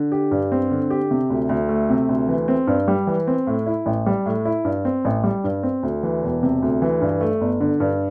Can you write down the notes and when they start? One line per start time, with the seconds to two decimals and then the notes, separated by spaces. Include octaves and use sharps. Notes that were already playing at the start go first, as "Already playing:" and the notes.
Already playing: D3
0.12 G4
0.31 G2
0.52 C4
0.71 D3
0.90 G4
1.11 C3
1.30 D2
1.49 D2
1.69 A3
1.90 C3
2.09 D2
2.28 E3
2.48 C4
2.67 G2
2.88 G3
3.07 E3
3.27 C4
3.47 A2
3.66 E4
3.86 A1
4.06 G3
4.26 A2
4.45 E4
4.65 G2
4.85 C4
5.05 A1
5.23 G3
5.44 G2
5.63 C4
5.83 D2
6.03 E3
6.23 E1
6.43 C3
6.62 D2
6.82 E3
7.01 G2
7.21 A3
7.41 G1
7.60 D3
7.80 G2